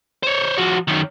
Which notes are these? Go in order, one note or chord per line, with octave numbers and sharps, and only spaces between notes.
C5 C#5
F3 F#4
F#2 D#3